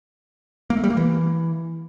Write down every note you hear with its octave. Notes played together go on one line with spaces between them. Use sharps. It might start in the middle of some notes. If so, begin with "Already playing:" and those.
A#3
A3
G3
A#3
E3